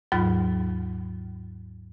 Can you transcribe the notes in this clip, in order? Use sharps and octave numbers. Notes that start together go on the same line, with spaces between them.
D#2 G#2 F#3 F4 B5